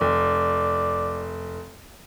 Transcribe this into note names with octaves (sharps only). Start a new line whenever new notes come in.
F1 D5